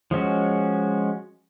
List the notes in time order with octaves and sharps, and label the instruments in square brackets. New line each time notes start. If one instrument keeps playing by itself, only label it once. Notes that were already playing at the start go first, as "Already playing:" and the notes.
[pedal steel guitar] F3 G#3 C#4 F#4